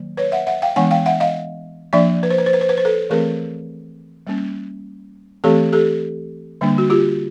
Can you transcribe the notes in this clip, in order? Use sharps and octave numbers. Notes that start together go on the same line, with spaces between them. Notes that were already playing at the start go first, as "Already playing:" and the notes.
Already playing: D#3 F#3 A#3
B4 C#5
E5 F#5
E5 F#5
F5 G5
E3 G#3 B3 D4 F#5 G#5
F5 G5
E5 F#5
D#5 F5
F3 A#3 D4 D5 E5
B4
C5
B4
C5
B4
C5
B4
C5
A4 B4
E3 A3 C4 G#4 A#4
G3 A#3 C#4
E3 A3 C4 G4 A4
G4 A4
D3 G3 A#3 D4
F#4
F4 G4